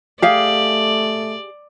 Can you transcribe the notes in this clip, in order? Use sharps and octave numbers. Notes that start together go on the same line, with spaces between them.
A3 G4 G#4 D5 F5